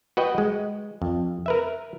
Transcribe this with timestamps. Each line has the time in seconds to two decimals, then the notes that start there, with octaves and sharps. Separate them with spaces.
0.17 F#4 B4 D#5 G5
0.38 G#3
1.02 F2
1.46 A#4 B4 E5